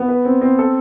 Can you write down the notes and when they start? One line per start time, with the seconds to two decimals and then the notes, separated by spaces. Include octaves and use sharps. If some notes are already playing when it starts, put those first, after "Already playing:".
Already playing: B3
0.08 B4
0.25 C4
0.41 C4
0.59 A4